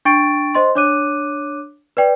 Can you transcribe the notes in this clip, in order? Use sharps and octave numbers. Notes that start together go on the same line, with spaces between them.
D4 G5 C#6 A6 D7
C5 D#5 C6
D4 C#5 D6 F#6 D#7
B4 D5 G5